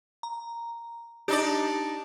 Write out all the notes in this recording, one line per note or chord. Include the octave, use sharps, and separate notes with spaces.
A#5
D4 D#4 G4 D5